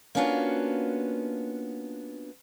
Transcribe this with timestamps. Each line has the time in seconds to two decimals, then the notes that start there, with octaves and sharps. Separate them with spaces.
0.15 A#3 B3 C#4 D4 F4 F#4